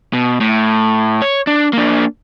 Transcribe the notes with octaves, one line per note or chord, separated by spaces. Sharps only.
B2
A2
C#5
D4
A#3 D4